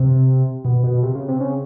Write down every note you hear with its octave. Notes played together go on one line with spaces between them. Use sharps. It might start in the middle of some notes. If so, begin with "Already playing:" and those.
Already playing: C3
B2
B2
C3
C#3
C3
C#3